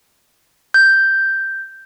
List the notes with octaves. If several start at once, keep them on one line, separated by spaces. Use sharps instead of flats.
G6